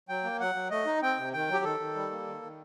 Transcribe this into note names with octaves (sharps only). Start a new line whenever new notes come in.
F#3 G5
A#3
F#3 F#5
F#3
A3 D#5
D#4
C4 G5
C3
D#3 G5
F#3 G4
D#3 A4
D#3
G3
A#3
D#3
D#3